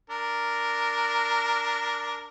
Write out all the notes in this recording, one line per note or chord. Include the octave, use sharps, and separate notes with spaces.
D4 A#4